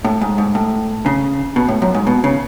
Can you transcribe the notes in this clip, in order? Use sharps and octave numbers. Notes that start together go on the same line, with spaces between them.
A2
G#2
G#2
A2
C#3
B2
A2
F#2
G#2
B2
C#3